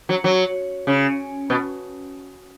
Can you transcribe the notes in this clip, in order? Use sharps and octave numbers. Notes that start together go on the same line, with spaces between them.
F#3
F#3
C#3
B2